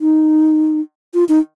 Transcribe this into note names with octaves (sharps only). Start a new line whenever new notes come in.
D#4
F4
D#4